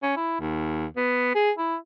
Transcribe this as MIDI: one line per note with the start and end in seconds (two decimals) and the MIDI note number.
0.03 0.14 61
0.17 0.36 64
0.40 0.86 39
0.97 1.31 59
1.35 1.51 68
1.58 1.76 64